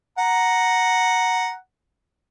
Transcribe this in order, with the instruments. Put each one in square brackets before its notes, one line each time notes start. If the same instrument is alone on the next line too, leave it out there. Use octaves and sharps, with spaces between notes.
[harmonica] F#5 A#5